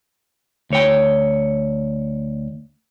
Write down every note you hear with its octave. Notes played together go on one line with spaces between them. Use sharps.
D2 C#5 G5